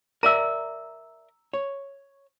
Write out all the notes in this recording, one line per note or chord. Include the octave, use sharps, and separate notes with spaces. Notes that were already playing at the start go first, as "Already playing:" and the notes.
A#4 D5 E5 A#5 E6
C#5